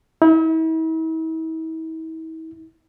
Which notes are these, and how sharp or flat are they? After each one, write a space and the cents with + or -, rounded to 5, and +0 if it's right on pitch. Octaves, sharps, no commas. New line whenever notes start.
E4 -45